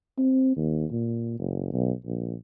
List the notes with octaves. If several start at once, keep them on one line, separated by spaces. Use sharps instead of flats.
C4
D#2
A#2
F#1
B1
A#1